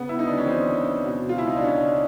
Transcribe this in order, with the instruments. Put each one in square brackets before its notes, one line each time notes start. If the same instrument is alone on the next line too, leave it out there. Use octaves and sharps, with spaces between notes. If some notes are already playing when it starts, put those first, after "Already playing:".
Already playing: [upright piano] C#3 B3
E4
D2 D#4
D4
C#4
E3 C4
D2
B2
F4
C#2 E4
D#4
D4
C#2 C#4